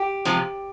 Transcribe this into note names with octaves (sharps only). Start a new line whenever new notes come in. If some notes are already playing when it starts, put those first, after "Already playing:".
Already playing: G4
C3 F3 G#3